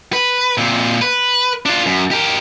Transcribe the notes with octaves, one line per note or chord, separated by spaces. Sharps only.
B4
A#2 C4
B4
D4 F4
F#2
G4 A#4